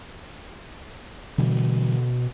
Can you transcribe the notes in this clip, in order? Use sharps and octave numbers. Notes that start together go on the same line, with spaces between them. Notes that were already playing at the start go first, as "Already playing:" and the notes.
B2 D3 E3 G3